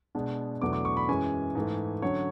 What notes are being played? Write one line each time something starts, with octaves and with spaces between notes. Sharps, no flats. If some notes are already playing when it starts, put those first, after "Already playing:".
B2 G#3 B3 D4
E2 B2 F#3 A3 D4 D6
D6
C#6
B5
F#2 E3 G#3 C#4 G#5
G#2 E3 A3
D3 F#3 C#4 C#5